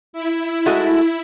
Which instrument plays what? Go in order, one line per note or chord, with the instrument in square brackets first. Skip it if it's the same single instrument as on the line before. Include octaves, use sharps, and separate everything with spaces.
[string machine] E4
[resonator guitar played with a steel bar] G#3 A3 F#4